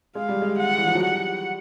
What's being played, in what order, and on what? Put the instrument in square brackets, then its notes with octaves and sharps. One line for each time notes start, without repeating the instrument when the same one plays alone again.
[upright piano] G#3 [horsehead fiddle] F5
[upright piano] G3
G#3
[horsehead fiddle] F#5
[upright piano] E3
F3
F#3
[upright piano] G3 [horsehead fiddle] F#5